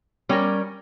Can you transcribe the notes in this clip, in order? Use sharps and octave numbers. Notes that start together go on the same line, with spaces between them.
G3 C#4 G4 A#4